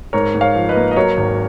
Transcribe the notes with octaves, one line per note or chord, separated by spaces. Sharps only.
G#2 A#4 C#5
G#2
C#5 F5
F3
B4 D#5
A#3
D#5
F#3 A#4 C#5
G#1